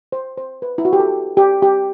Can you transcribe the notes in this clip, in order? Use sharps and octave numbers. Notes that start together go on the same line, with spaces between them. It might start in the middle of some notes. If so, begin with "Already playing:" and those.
C5
C5
B4
E4
F#4
G4
A4
G4
G4